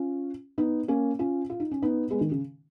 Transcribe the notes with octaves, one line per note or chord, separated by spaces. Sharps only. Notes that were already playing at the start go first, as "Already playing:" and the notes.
Already playing: C#4 F4
B3 D#4
A#3 C#4
C#4 F4
F4
D#4
C#4
B3 D#4
G#3 B3
D#3
C#3